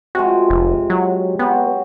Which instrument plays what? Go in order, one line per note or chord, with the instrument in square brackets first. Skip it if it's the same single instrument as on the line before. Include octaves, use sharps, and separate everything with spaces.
[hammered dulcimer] C3 F3 G#3 [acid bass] F#4
[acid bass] F1
F#3
[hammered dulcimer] F#3 C4 [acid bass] B3